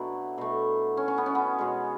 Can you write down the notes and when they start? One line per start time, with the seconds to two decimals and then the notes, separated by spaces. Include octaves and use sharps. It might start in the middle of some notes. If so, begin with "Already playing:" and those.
Already playing: B2 F#3 A3 D4 E4
0.38 B2 A3
0.97 C#4
1.08 C#4
1.18 B3
1.26 C#4
1.35 B3
1.59 B2 G#3